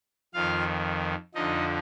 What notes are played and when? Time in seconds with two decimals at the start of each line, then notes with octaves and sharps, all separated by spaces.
0.34 F2 D#3 F4 F5
1.34 F2 D3 F3 D#4 D#5